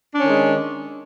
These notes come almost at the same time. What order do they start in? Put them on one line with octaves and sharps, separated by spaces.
D4 C#4 D#3 G#3